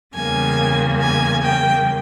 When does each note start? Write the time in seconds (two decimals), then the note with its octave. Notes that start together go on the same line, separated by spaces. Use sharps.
0.15 E2 C#3 G3 A#3 G#5
1.00 G#5
1.43 G5